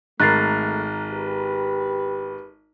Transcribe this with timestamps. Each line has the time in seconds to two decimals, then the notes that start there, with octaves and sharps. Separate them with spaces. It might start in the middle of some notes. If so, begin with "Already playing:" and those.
0.20 G#1 A3 A#4 F#6 A6 C7
1.10 G4 B4